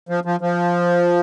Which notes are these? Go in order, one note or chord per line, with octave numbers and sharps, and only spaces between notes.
F3
F3
F3